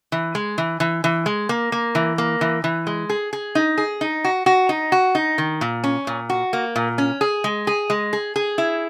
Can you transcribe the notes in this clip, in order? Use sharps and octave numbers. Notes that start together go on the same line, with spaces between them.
E3
G#3
E3
E3
E3
G#3
A#3
A#3
E3
A#3
E3
E3
G#3
G#4
G#4
D#4
G#4
D#4
F#4
F#4
D#4
F#4
D#4
D#3
A#2
C#4
A#2
F#4
A#3
A#2
C#4
G#4
G#3
G#4
G#3
G#4
G#4
E4